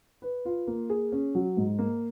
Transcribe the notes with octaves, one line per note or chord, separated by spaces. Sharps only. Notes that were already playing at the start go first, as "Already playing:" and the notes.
B4
F4
A#3
G#4
C#4
F#3
G#2
A#3